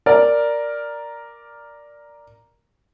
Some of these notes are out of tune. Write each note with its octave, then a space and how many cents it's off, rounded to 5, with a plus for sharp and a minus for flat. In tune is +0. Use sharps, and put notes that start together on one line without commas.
A#4 +0 D5 +0